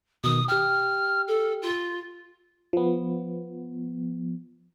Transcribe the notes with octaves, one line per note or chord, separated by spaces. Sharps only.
B2 D#3 D#6
G4 G5 F6
A4
F4
F3 B3